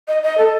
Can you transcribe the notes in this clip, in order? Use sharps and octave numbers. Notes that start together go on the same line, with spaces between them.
D#5
D#5
A4